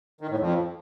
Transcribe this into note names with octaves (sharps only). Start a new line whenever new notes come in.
D#3
A2
F2